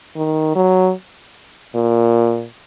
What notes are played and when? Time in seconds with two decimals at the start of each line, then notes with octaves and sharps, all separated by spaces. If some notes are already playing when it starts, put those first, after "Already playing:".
0.16 D#3
0.56 F#3
1.75 A#2